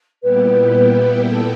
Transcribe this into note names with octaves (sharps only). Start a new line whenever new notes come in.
A#2 G3 B3 E4 G4 B4
A4